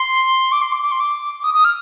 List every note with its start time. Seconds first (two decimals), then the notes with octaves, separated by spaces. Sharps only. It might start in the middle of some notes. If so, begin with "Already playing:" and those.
Already playing: C6
0.52 D6
0.62 C6
0.72 D6
0.82 D6
0.91 C6
1.00 D6
1.44 D#6
1.54 D#6
1.65 F6